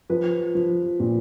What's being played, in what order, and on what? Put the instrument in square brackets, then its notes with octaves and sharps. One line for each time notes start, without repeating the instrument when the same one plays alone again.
[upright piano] F3 B4
F3
A#2